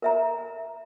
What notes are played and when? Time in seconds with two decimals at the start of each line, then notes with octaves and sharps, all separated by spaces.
0.02 A#4 E5 A#5